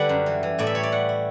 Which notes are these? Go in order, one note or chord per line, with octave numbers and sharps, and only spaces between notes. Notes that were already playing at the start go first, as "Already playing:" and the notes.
Already playing: D3 G3 A4 B4 D5 F#5
F#2
E3
E3
A2 D5
E5
G3 C#5
D5
G3 F#5
E4